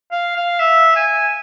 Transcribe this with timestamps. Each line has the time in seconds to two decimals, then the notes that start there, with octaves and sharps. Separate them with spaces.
0.12 F5
0.36 F5
0.59 E5
0.96 G#5